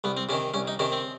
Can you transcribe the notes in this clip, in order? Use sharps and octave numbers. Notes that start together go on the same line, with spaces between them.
C2 B3
C4
C3 D#3 C#4
C2 C#4
D#4
C3 D#3 C#4
C4